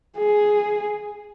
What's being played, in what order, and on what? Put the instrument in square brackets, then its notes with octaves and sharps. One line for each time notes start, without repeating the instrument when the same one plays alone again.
[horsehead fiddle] G#4